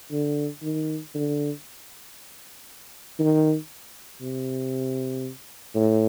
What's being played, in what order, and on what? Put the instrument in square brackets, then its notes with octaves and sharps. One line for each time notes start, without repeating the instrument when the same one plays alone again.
[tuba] D3
D#3
D3
D#3
C3
A2